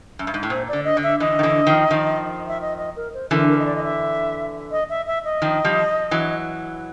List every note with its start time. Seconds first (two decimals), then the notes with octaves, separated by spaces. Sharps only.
0.19 F#2
0.27 G2
0.34 G#2
0.43 A2
0.50 A#2 C5
0.68 D3 D5
0.85 D#5
0.97 D3
1.03 E5
1.20 D3 E3 D#5
1.39 D#3
1.43 D3 E3
1.67 D#3 F3
1.91 D#3 F3
2.47 E5
2.61 D#5
2.78 D#5
2.96 A#4
3.14 C5
3.31 D3 E3 A#4
3.49 A#4
3.59 D#5
3.66 D5
3.76 D#5
3.84 E5
4.71 D#5
4.89 E5
5.06 E5
5.25 D#5
5.42 D#3 F3
5.64 F3 G3
6.11 E3 F#3